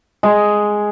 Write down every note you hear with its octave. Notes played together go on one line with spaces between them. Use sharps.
G#3